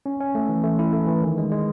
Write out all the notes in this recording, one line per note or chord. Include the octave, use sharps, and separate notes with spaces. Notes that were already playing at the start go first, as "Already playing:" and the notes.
C#4
C#4
A3
E3
A3
E4
A3
E3
D#3
G#3
G#3